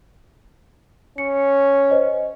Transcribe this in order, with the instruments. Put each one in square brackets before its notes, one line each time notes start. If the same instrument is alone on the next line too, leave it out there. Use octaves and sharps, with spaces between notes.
[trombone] C#4 [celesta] C#7
[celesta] C5 D#5